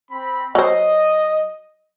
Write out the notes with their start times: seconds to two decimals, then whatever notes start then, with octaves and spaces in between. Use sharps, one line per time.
0.11 C4 B5
0.55 F#3 C5 D#5